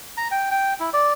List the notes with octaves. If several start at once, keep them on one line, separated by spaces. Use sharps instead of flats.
A#5
G5
G5
E4
D5